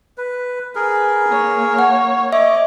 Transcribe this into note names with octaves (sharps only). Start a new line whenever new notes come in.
B4
G#4 A#4 B4
A#3 C#5
F#5
C#5 D#5 E5 D6